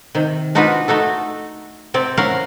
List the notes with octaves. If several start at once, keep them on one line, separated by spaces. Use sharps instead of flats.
C3 D#3
D4 D#4 F4 F#4 A#4 B4
A3 D#4 F#4 A4
C3 C4 D5
C#4 E4 A#4 C#5 F5 F#5